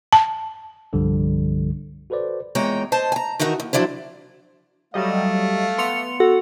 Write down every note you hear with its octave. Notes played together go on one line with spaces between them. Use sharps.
A5
C2 G2 D3 F3 G3
F#4 A4 B4 C5 D5
E2 A#2 G#3 C#5 G5 A#5
C5 D#5 A5
G#5 A#5
D#3 E3 D#4 F#4 A#4
D#2
F3 F#3 D4 E4 C5
F#3 G3 A3 D#5 F5
B3 C6 C#7 F7
F#4 A4 F#5